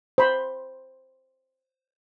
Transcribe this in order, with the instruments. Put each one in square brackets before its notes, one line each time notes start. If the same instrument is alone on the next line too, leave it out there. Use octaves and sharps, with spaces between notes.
[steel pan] C5 B5